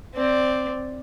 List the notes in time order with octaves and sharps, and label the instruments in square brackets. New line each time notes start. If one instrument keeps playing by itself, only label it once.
[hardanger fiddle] C4 D5